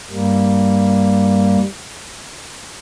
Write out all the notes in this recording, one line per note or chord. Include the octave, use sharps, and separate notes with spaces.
G2 G3 A#3